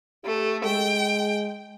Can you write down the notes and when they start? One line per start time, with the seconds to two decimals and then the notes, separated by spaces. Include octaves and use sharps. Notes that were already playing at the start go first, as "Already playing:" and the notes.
0.24 A3 G4
0.65 G#3 G5